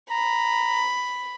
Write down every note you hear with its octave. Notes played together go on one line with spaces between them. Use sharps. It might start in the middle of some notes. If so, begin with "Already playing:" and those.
A#5 B5